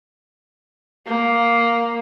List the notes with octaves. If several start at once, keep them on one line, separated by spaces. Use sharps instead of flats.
A#3